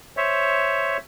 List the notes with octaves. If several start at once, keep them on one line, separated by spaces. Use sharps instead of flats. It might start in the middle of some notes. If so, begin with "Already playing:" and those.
C5 C#5 E5